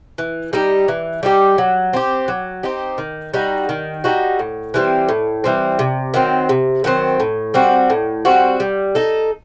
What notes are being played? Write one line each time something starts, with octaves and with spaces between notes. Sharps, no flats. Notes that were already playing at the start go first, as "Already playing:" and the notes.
E3
G3 D#4 G4
E3
G3 D#4 G4
F#3
C4 D#4 G4
F#3
C4 D#4 G4
D#3
G3 D#4 F#4
D#3
G3 D#4 F#4
A2
E3 G3 C4
A2
E3 G3 C4
C3
D#3 F#3 C4
C3
D#3 F#3 C4
A2
G3 C4 F#4
A2
G3 C4 F#4
G3
D#4 A4